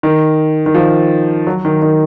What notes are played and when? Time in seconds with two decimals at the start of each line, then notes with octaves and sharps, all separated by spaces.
0.03 D#3
0.66 D#3
0.74 F3
1.47 F#3
1.65 D#3
1.82 D#3